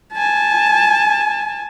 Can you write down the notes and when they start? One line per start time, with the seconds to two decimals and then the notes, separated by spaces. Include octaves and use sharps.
0.13 G#5 A5